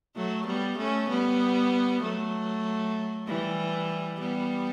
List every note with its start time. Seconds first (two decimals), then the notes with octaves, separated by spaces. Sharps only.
0.16 F#3 A3
0.46 G3 B3
0.78 A3 C#4
1.09 G3 B3
2.02 F#3 A3
3.27 E3 G3
4.20 G3 B3